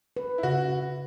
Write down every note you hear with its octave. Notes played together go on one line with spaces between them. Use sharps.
B4
E4
C#3 F#4
C#3